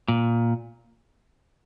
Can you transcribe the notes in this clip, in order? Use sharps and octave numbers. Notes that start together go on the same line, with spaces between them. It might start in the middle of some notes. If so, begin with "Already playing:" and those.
A#2